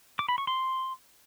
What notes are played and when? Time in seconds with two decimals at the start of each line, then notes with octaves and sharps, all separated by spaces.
0.19 D6
0.29 B5
0.38 C#6
0.47 C6